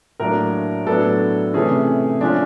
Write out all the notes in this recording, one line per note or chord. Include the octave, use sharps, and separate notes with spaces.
A2 F#3 A#3 D4 A#4
A2 F#3 B3 D4 A4
C3 E3 A3 C#4 G#4
F3 G#3 C#4 D4